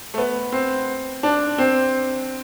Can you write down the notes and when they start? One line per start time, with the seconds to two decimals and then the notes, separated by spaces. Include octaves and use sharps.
0.14 A3
0.18 B3
0.52 C4
1.23 D4
1.58 C4